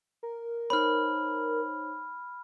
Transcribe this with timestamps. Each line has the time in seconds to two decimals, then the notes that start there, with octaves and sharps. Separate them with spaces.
0.23 A#4
0.70 D#4 C5 C#5 B5 F6